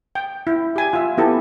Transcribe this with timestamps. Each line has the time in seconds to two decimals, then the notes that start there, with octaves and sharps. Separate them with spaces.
0.15 G5
0.47 E4
0.76 G4 G#5
0.93 F4 E5
1.18 B3 E4 G4 A4